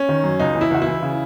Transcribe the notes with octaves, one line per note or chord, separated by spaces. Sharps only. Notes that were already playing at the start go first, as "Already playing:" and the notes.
Already playing: C#4
D#3
F#2
C#2 D#4
E3
E4
C#2 F#4
E4
E3
C#3